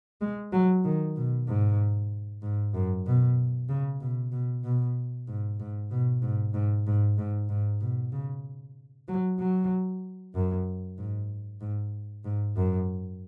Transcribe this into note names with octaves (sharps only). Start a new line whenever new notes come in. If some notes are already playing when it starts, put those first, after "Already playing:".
G#3
F#3
D#3
B2
G#2
G#2
F#2
B2
C#3
B2
B2
B2
G#2
G#2
B2
G#2
G#2
G#2
G#2
G#2
B2
C#3
F#3
F#3
F#2
G#2
G#2
G#2
F#2